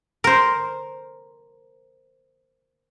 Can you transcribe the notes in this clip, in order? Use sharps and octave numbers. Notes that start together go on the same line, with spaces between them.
A#4 C5